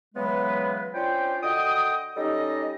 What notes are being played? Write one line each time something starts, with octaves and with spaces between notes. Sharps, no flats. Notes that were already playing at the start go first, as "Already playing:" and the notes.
C#3 E3 F#3 G#3 B3 B4
C#4 D4 F4 C5 G5
D3 F#4 D#5 G5 D#6
G3 C#4 D#4 A4 D#5